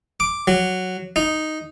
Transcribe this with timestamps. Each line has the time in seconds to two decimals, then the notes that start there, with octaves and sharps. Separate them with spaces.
0.20 D6
0.47 F#3
1.16 D#4